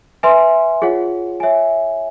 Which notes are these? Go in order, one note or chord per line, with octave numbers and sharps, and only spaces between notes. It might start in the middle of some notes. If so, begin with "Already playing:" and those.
B4 E5 G#5 C6
F4 G#4 C#5 F#5
C#5 E5 G#5